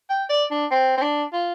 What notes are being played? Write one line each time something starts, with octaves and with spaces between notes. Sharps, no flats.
G5
D5
D4
C4
C4
D4
F4